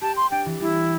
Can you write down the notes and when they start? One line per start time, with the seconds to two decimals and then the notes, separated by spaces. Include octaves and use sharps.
0.01 G4 A5
0.17 C6
0.31 D4 G5
0.46 E3
0.60 G3 E4